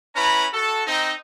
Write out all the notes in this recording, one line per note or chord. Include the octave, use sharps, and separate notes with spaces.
C#4 E4 B4 A#5 B5
F#4 A4
C4 D#4